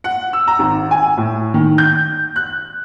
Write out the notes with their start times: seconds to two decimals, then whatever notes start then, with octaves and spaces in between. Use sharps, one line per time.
0.04 F#5
0.33 E6
0.48 A#5
0.59 G#1
0.91 G#5
1.17 A2
1.54 D#3
1.78 G6
2.36 F#6